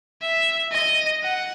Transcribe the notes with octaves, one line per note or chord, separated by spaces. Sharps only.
E5
D#5
F#5